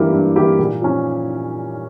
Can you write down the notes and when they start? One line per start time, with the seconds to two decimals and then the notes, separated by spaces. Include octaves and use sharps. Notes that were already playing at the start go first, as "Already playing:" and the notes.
Already playing: G2 E3 A#3 E4 G4
0.12 G2
0.36 E3 A#3 E4 G4
0.59 A#2
0.82 F3 C#4